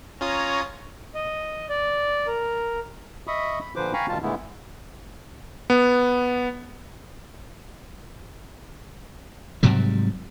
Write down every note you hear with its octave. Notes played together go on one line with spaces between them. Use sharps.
C#4 F4 C#5 A#5 D#6
D#5
D5
A#4
D#5 E5 B5 C#6 D#6
B5
A#2 D3 F3 B4 C5 D6
F5 G5 G#5 A#5 B5 C#6
D2 B2 D#3 G3 F4 A5
A#2 D3 G#3 A3 B3 E4
B3
G#2 C3 F#3 G3